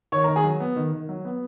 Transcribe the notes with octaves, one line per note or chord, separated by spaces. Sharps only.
D#3 C#5 C#6
A#4 A#5
D#3
G#4 G#5
F#3
B3
D#3
D#3
F#3
B3